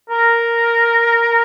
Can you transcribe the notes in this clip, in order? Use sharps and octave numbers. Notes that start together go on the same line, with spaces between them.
A#4